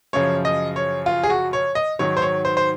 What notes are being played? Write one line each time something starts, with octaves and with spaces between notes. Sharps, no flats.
F#2 C#3 F3 C#5
D#5
C#5
F4
G#4
F#4
C#5
D#5
G#2 D#3 F#3 C#5
C5
C#5
C5
C5